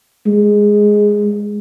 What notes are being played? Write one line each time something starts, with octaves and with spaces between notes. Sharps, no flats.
G#3